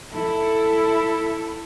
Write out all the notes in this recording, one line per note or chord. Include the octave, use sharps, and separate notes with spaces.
E4 A4